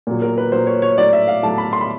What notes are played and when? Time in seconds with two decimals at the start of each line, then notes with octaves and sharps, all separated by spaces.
0.07 A#2 F#3
0.22 A#4
0.38 B4
0.52 A#2 F#3 C5
0.67 C#5
0.82 C#5
0.98 A2 F#3 D5
1.13 E5
1.28 F5
1.43 A2 F#3 A5
1.58 B5
1.73 C6
1.81 B5